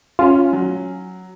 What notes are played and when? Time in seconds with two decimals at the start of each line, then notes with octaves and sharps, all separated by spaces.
0.19 C#4 F4
0.53 F#3